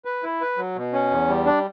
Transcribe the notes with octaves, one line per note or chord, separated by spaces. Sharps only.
B4
E4
B4
F#3
B2
C#4
E2
G3
D4